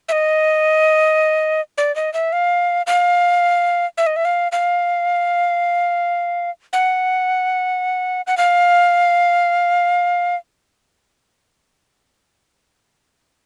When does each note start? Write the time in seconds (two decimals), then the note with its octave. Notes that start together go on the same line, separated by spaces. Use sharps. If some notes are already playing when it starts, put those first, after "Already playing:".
0.09 E5
0.12 D#5
1.78 D5
1.96 D#5
2.14 E5
2.32 F5
2.87 F5
3.98 E5
4.07 D#5
4.16 E5
4.25 F5
4.52 F5
6.73 F#5
8.27 F#5
8.37 F5